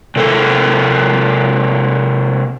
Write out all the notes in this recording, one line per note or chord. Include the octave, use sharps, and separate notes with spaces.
C3 A#3 A4